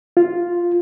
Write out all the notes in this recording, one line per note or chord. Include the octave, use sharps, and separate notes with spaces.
F4